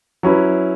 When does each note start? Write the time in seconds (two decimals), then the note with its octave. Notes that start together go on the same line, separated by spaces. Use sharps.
0.23 F#3 C#4 E4 B4